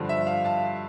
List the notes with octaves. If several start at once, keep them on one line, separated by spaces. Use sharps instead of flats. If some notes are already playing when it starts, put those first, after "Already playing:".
Already playing: G2 D3 F3
E5
F5
F5 A5